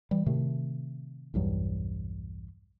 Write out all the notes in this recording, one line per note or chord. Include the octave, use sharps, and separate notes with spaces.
E3 G3
A2 C3 D#3 A3
B1 E2 G2 F#3